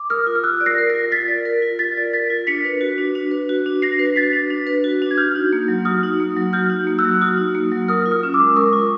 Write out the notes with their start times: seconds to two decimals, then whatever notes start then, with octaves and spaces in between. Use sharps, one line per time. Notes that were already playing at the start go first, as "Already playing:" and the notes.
Already playing: D6
0.10 A#4 D#6 F6
0.27 F4
0.35 F6
0.44 F4 E6 F#6
0.61 D5
0.66 A#6 C7
0.78 A#4
0.90 A#6 C7
0.94 F4
1.11 F4 A6 B6
1.28 D5
1.45 A#4
1.62 F4
1.79 F4 A6 B6
1.97 D5
2.13 A#4 A6 B6
2.30 F4
2.47 D4 B6 C#7
2.65 B4
2.81 F#4
2.98 D4
3.15 D4
3.31 B4
3.49 F#4
3.66 D4
3.82 D4 A#6 C7
3.99 B4
4.06 C7
4.16 F#4 A6 B6
4.33 D4
4.50 D4
4.67 B4
4.84 F#4
5.02 D4
5.11 G#6
5.18 F#4 F6 G6
5.36 D#4
5.53 A#3
5.68 F#3
5.85 F#4 D#6 F6
6.03 D#4
6.20 A#3
6.37 F#3
6.53 F#4 F6 G6
6.70 D#4
6.87 A#3
6.99 E6 F#6
7.04 F#3
7.21 F#4 D#6 F6
7.38 D#4
7.55 A#3
7.72 F#3
7.88 A#4 D#6 F6
8.06 F4
8.11 D#6 F6
8.23 C#4
8.34 D6 E6
8.40 G#3
8.56 A#4 C#6 D#6
8.73 F4